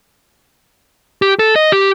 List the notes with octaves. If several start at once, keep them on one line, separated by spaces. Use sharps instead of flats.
G4
A4
D#5
G4